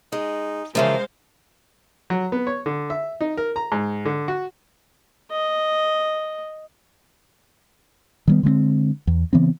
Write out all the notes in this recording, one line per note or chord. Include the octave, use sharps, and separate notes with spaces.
G#3 D#4
C#3 E3 F3 G#3 A#4 C5 F5
F#3
B3
C#5
D3
E5
D#4
A#4
A#5
G#2
D3
F#4
D#5
D#3 G3 B3
D3 G#3 A#3 C4
E2
C#3 E3 B3 C4